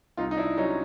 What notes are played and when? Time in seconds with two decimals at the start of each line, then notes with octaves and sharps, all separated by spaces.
0.17 C2 D#4 F4
0.31 D#4
0.37 D4 E4
0.58 F#3 C#4 D#4